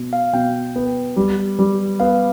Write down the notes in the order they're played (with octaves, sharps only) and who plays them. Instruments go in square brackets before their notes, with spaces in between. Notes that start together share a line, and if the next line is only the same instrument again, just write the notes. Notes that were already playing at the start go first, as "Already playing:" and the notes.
Already playing: [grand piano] B2
[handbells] F5
[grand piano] B2 [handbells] G5
[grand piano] B3
G3
G3
[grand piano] B3 [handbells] F5